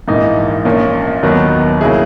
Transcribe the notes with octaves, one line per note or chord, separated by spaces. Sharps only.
A#1 G#2 E3 A#3 D#4
A#1 A#2 A#3 C#4
D#2 D#3 F#3 B3 F#4
C#3 F#3 A#3 E4 G#4